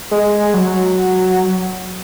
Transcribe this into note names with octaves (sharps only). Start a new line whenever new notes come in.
G#3
F#3